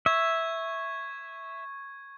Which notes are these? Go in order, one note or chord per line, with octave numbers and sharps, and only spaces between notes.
E5 C#6 G#6